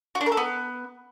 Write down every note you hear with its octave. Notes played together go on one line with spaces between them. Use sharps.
F#4
D4
A#4
A4
B3